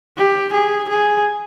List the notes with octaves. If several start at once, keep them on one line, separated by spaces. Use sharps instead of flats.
G4
G#4
G#4